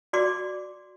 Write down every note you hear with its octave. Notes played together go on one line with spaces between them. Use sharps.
F#4 D5 C6 D6